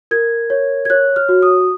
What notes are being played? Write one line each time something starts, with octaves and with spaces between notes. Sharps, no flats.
A#4 G#6
C#5
G#6
C#5 F#6
F6
F#4
D#6